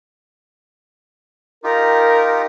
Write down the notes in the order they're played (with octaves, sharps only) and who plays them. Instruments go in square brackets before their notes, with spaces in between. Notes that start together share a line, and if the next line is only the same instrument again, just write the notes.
[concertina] D#4 F4 G4 [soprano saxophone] A#4